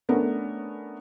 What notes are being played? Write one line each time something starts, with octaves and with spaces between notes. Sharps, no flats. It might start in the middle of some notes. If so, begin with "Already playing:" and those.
A3 B3 C#4 D4 A#4